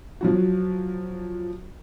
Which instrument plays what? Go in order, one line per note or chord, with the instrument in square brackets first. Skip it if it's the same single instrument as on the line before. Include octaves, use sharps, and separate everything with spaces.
[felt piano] F3 F#3 F#4